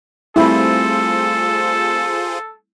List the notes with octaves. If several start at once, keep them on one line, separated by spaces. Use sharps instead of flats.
G3 A3 C4 E4 F4 G#4 A4 C5